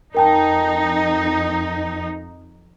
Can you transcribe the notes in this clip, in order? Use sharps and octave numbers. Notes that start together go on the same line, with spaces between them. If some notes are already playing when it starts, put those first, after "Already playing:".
F2 D#4 A#4 G5 A5